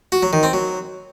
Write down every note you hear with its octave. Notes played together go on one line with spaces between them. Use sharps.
F#4
F#3
D#3
C4
F#3